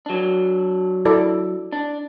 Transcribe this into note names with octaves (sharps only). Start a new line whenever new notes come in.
F#3 D4
E4 A4 D5
D4